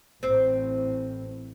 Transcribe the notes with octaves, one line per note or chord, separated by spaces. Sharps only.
A1 A2 C4 C5